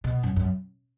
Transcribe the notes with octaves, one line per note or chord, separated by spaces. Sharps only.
B2
F#2
F#2